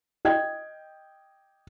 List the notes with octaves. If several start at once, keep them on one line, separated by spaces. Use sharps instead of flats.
D#5 G5 G#6